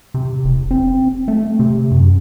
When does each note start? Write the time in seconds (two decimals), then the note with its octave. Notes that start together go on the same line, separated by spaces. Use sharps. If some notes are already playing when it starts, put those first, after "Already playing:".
0.14 C3
0.45 E1
0.71 C4
1.28 A3
1.60 C3
1.91 F#2